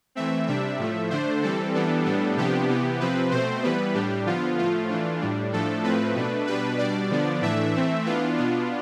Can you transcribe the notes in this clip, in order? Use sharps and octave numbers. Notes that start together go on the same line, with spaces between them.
E3 A3 C4 E5
C3 G3 D4 E5
A2 F3 A3
D3 A3 D4 C5
E3 G3 C4 A4
E3 G3 B3 D4
A2 G3 B3 D4
C3 F3 B3 D4 G4
C3 E3 B3
C3 F3 C4 B4
B2 A3 C4 C5
E3 G3 B3 B4
A2 G3 D4 G4
D3 F3 B3 F4
A2 F3 A3 F4
E3 A3 D4
A2 G3 D4
A2 F3 A3 D4 A4
A2 F3 A3 C4 B4
B2 A3 D4
B2 G3 D4 B4
B2 G3 D4 D5
D3 F3 B3 D4
A2 E3 A3 D4 E5
E3 A3 C4
E3 B3 D4 F4
B2 B3 D4